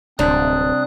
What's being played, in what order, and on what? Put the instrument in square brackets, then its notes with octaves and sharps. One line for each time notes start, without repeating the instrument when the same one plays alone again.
[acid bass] D1 [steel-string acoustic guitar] C3 G3 D4 [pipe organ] C4 D#6 F#6